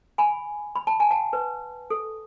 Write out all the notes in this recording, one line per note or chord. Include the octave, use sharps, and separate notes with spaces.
G#5 B5
B5
A5
G#5
F#5 A5
B4
A4